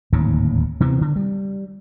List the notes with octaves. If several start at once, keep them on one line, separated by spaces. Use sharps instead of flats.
D1 D#2 G#2 C#3
C3 E3 B3 C4
D3
G3